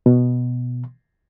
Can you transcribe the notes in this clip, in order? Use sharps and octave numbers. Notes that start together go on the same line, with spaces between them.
B2